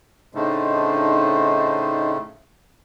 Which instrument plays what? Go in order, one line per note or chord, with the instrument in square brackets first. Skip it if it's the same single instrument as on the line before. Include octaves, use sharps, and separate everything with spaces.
[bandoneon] A2 C#3 A3 [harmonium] D4 D#4 C5